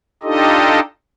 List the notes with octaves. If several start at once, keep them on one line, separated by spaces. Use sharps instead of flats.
D4 D#4 F4 G4 A4 D#5